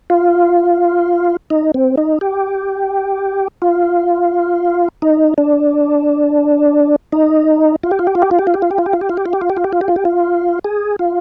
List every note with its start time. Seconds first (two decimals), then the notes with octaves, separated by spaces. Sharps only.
0.10 F4
1.50 D#4
1.74 C4
1.97 D#4
2.21 G4
3.62 F4
5.02 D#4
5.38 D4
7.12 D#4
7.83 F4
7.91 G4
7.99 F4
8.07 G4
8.15 F4
8.22 G4
8.31 F4
8.39 G4
8.47 F4
8.54 G4
8.62 F4
8.71 G4
8.78 F4
8.86 G4
8.93 F4
9.01 G4
9.09 F4
9.17 G4
9.26 F4
9.33 G4
9.41 F4
9.50 G4
9.57 F4
9.64 G4
9.73 F4
9.81 G4
9.88 F4
9.96 G4
10.05 F4
10.64 G#4
10.99 F4